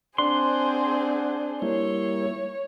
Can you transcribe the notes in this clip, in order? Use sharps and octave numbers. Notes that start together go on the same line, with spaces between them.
C4 D4 G#4 C5 F#5 C6
G3 A#3 E4 C#5